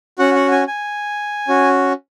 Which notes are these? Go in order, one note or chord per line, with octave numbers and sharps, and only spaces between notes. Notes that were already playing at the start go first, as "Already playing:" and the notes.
C#4 F#4 F#5
F#5
G#5
G#5
C#4 F#4